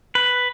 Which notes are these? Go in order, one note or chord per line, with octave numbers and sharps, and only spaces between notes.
B4